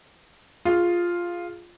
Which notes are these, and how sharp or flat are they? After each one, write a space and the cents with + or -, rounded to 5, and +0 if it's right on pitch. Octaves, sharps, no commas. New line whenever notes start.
F4 +0 G#4 +0